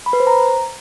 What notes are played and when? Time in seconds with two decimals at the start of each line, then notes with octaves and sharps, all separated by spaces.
0.06 B5
0.13 B4
0.20 C5
0.27 A#5